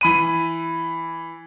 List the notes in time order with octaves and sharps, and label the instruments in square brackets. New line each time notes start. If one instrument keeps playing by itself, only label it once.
[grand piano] E3 B5 D#7